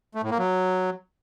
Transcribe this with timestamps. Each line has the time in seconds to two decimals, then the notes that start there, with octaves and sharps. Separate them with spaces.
0.15 A3
0.23 A2
0.31 A#3
0.39 F#3